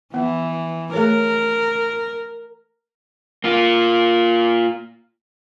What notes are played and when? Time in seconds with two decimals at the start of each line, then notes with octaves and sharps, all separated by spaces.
0.14 E3 B3
0.93 A3 G#4 A#4 C#5
3.44 A#3 F4